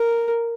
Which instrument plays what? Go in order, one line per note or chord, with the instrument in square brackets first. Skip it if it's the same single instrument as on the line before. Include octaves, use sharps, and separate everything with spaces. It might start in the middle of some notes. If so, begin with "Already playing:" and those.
Already playing: [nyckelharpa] A#4